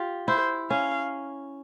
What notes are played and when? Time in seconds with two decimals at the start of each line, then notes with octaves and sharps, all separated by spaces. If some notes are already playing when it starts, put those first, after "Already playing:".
Already playing: F4 G4
0.28 E4 C5
0.70 C#4 F5